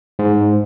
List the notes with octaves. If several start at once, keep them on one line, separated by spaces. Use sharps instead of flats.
G#2